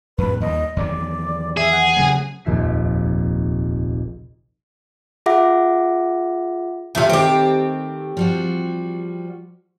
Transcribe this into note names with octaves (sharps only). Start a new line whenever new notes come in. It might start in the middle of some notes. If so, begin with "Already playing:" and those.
F2 A2 B4
D#2 G3 D#5
E2 D#3 F#3 D5
G#4 E5
F#5
C#3 F#3 A3
F1 A#1 D#2 E5 B6 C7
F4 G#4 E5 F#5 D6 A#6
E2 C3 A3 F4 F5
D#3 A3 C4 G4
F3 G3 F#4